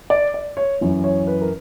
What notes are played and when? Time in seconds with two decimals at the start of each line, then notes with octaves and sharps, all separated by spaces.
0.10 D5
0.34 D5
0.57 C#5
0.81 F#2 E3
1.04 C#5
1.27 B4
1.42 A#4